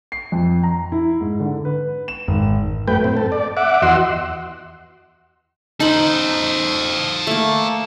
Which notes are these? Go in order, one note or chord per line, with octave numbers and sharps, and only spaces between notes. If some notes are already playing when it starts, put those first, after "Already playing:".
C7
F2
A#5
E4
G#2
D3
B4
E7
G#1
F#2 A3 B4 G5
A2 C4
A4
D5
E5 F#5 D6
E2 F#4 D#5 F#5 C6 E6
D#4 A4 C5 B5
A3 A#3